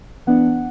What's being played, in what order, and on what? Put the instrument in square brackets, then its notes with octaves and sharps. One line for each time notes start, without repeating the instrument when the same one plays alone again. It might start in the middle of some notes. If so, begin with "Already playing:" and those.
[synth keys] E3 B3 D4 F#5